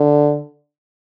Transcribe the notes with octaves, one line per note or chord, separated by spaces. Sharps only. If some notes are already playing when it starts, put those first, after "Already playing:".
Already playing: D3